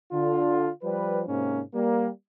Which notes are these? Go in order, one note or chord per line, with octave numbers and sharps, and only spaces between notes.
D3 F4
F3 G3 B4
G#2 C3 A#3 C#4
G3 A#3